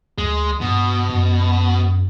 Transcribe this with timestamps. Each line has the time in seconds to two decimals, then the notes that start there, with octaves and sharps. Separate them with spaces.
0.18 D2 G#3
0.61 G2 B2
1.09 F#2